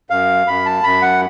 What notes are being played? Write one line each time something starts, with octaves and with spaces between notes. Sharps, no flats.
F#2 F5
F#2 B5
A5
F#2 B5
F#5